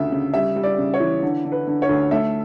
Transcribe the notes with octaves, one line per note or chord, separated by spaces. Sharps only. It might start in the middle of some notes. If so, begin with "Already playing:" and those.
Already playing: D2 C#3 E5
C#3
G3 E5
G3
D5
C#3
C#5
E3
D3
D3
B4
D3
C#5
D2
A3 E5